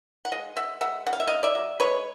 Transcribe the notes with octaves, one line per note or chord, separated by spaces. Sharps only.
F#5
G#3 D#5 F5
G#3 E5 F#5
G#3 E5 F#5
C#3 F#5
F5
E5
C#3 D#5 F5
D5 E5
F#3
G#3 B4 C#5